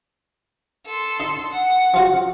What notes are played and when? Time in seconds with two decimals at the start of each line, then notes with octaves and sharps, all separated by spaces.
0.86 A4 C6
1.20 D#4
1.51 F#5
1.94 F3 F4 F#4